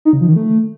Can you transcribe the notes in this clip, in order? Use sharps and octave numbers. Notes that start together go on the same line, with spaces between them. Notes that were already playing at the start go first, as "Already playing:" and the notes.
D#4
C#3
F3
D#3
A3